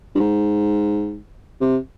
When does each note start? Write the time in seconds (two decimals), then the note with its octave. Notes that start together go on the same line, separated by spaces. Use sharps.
0.15 G2
0.20 G#2
1.61 C3